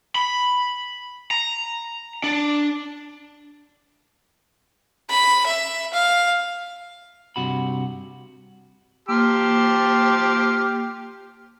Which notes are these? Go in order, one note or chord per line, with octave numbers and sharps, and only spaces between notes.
B5
A#5
D4
B5
E5
F5
G2 C3 F#4 B5
A#3 G4 A5 C6 F6